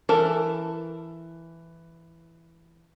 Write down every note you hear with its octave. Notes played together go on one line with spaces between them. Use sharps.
E3 A4 A#4 A5